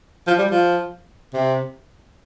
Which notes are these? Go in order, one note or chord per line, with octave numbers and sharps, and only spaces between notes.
F3
G3
F3
C3